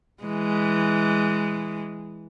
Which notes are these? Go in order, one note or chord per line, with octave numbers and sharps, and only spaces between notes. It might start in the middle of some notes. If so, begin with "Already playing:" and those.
E3 G#3